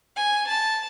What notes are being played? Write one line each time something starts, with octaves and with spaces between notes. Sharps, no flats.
G#5
A5